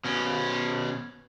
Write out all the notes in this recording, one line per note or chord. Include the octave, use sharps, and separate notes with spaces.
B2 C#4